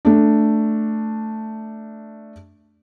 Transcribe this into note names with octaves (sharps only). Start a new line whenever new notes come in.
A3 D4